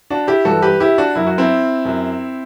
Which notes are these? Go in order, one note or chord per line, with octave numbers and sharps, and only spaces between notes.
D4 F#4
E4 G4
G2 E3 F#4 A4
G4 B4
E4 G4
D4 F#4
F#2 F#3 E4
F#4
C4 E4
F#2 F#3